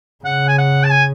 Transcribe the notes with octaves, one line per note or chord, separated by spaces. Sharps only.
C#3 F#5
G#5
F#5
A5
G#5